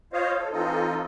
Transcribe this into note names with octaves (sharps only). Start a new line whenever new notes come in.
F4 C5 C#5 D#5 F5
A4
E3 C4 D#4 F4 A4 D#5